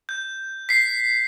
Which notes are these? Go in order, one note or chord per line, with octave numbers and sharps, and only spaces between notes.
G6
B6 C7